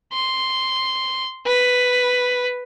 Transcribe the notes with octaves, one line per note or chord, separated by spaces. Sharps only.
C6
B4